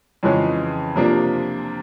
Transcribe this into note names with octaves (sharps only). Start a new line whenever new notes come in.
F2 C#3 E3 G#3 C#4
C3 F3 A#3 D4